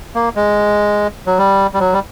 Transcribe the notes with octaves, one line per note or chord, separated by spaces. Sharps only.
A#3
G#3
F#3
G3
G3
F#3
G3